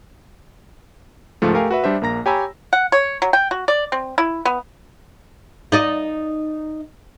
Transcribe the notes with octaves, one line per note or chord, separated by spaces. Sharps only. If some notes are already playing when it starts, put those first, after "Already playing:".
C#2 G#2 F3 A3
A3 G4 A#4 F5 G#5
F#4 B4 E5
G3 D4 C5 E5
A#1 A#3 A#5 A#6
G4 C#5 G#5 A#5 B5 E6
F#5
C#5
F#3
G5
F#4
D5
C4
E4
B3
D#4 D5 D#5